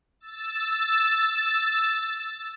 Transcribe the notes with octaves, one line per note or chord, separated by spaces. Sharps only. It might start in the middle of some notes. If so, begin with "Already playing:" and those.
E6 A6